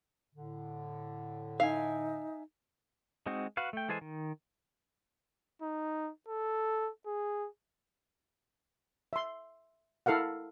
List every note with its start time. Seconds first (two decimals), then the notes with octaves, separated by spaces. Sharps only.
0.34 A2 D3
1.60 D#4 E5 F5 G#5
3.26 G#3 C4 D#4 F#4
3.57 F#4 B4 F5
3.73 A3 G5
3.89 E3 G#3 A4 C5 G#5
4.01 D#3
5.62 D#4
6.28 A4
7.06 G#4
9.13 E5 C6
10.06 E4 A4 A#4 F5 F#5